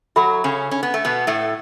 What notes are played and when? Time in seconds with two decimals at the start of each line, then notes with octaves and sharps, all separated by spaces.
0.16 F#3 F#4 A4 E5 B5
0.44 C#3 C#4
0.71 C#4
0.83 B3
0.94 A3
1.05 B2 B3
1.27 A2 A3